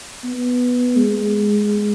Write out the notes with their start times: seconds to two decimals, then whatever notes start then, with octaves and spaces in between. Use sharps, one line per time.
0.24 B3
0.96 G#3